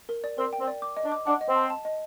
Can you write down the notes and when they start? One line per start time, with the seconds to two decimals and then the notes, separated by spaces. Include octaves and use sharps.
0.09 A#4
0.24 D5
0.38 C4 A#4
0.53 G5
0.60 C4
0.67 D5
0.82 D6
0.97 D#5
1.04 D4
1.12 D6
1.27 D4 F#5
1.41 D#5
1.48 C4
1.56 A5
1.70 A5
1.85 D#5